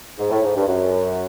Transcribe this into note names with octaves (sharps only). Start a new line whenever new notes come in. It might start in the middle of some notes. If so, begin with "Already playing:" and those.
G#2
A2
G#2
G2
F#2